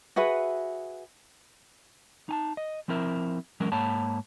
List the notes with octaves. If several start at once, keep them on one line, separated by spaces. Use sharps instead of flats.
F#4 G#4 B4 E5
D#4 G#5 A5
D#5
F3 C4 E4 A#4 E5
E3 F#3 G#3 C#4 A#4
G#2 A#3 C#5 F#5 A5 B5